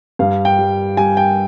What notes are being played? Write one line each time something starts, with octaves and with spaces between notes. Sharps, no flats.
G2 F5
G5
G3
G3 G#5
G5